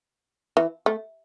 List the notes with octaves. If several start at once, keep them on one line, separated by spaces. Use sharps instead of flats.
E3
A3